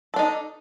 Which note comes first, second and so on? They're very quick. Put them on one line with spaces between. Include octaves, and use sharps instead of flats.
A4 D4 D#4